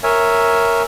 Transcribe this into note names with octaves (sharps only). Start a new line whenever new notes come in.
A#4 C#5 E5 G#5